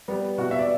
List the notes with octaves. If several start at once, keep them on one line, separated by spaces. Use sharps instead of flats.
G3 B3
B2 F#4
E5
D5